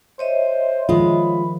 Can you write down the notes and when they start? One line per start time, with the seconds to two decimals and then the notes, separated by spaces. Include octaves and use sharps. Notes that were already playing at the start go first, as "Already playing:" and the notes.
0.19 C5 C#5 D#5 E5
0.89 D#3 F3 G#3 F4 B5